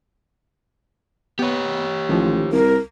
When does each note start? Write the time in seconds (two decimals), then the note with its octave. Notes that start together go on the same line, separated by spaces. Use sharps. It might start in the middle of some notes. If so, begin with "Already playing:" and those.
1.39 B3 G4 B4 C#5
2.09 A1 D#3 F3
2.52 C2 A#4